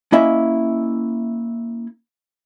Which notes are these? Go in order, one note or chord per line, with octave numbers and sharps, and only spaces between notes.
A#3 C#4 E4 D#5 E5